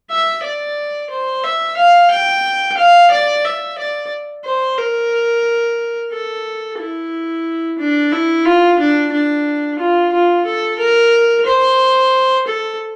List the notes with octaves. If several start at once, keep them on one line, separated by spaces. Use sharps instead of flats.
E5
D5
C5
E5
F5
G5
F5
D5
E5
D5
C5
A#4
A4
E4
D4
E4
F4
D4
D4
F4
F4
A4
A#4
C5
A4